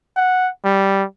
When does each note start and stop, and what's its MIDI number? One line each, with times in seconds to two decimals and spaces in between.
0.17 0.50 78
0.64 1.04 55